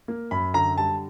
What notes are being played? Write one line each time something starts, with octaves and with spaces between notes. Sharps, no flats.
A#3
F#2 B5
D3 A#5
G3 A5